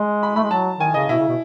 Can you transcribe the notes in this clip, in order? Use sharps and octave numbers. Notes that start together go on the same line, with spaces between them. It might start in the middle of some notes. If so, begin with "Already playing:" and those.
Already playing: G#3
B5
A3 B5
G#3
F#3 A5
D#3 G#5
C#3 D#5
B2 E4
C#3
B2